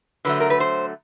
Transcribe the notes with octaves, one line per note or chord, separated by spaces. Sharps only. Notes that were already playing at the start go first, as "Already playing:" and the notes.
D3 F#3 A3 B4
A#4
B4
C5